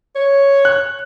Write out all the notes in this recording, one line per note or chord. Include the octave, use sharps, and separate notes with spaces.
C#5
F#6